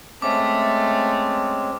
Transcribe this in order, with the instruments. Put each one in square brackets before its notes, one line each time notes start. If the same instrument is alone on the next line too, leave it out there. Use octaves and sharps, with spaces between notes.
[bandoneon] G#3 C4 C#4 [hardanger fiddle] A3 [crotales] D6